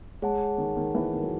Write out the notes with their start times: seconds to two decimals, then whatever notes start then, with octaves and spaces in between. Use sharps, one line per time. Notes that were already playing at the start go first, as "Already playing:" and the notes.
0.22 G#3 G#4 C#5 F#5 A5
0.58 D#3
0.77 D#3
0.95 E3
1.13 D#3
1.23 F#3